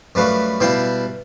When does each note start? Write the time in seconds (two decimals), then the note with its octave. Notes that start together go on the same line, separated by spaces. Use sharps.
0.15 F#2 G3 A3 B4 F5
0.60 B2 G3 E4 F5 G5 C6